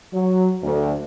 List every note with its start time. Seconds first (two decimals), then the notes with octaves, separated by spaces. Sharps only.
0.14 F#3
0.63 D2